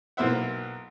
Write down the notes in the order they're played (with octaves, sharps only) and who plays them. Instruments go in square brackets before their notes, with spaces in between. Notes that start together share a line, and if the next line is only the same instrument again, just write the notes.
[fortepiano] B1 A#3 E4 C5 E5 F#5